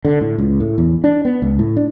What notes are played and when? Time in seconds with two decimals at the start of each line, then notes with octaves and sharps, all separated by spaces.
0.05 D3
0.21 A2
0.38 C#2
0.60 A2
0.78 E2
1.04 D4
1.25 B3
1.42 C#2
1.59 A2
1.77 D4